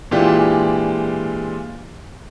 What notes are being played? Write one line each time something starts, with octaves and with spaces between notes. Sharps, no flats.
A#2 E3 G#3 D4 F4 G4